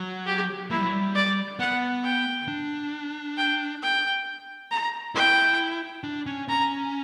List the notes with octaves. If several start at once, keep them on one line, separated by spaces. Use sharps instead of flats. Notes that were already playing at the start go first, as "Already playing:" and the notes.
Already playing: F#3
G4
A#3 E4
G3
F#3
G3
D5
B3 F#5
G5
D4
G5
G5
A#5
E4 G5
D4
C#4
C#4 A#5